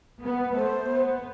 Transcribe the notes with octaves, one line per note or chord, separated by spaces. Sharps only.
B3
A3 C5
B3